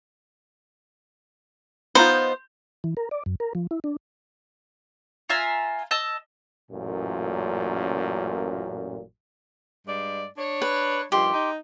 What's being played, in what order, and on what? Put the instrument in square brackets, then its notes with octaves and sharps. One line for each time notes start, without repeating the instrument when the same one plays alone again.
[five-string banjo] B3 D#4 F4 [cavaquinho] C5
[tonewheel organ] E3
A#4
D5
F#2
A#4
F3
E4
D4
[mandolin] F4 E5 G#5 A#5
D#5 A5 E6
[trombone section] A1 F#2 A#2
[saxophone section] G2 G#3 D5
D4 C#5
[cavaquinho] B4
[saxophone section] G2 D#3 F3 [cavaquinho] G4 C6
[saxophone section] D#4